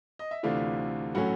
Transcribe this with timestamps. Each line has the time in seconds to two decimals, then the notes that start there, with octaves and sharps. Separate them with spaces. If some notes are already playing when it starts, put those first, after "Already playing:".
0.19 D#5
0.31 E5
0.43 D2 C3 E3 A3 D4 F4 F5
1.15 A2 F#3 A3 C#4 F#4 F#5